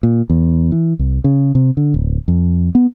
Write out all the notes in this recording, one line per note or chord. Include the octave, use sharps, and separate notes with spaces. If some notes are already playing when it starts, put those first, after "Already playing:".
A#2
E2
E3
C2
C#3
C3
D3
D1
F2
B3